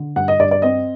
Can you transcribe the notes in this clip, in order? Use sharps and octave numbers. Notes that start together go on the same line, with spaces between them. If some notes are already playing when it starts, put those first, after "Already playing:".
Already playing: D3
G2 F#5
D#5
G2 D5
D5
C4 D#5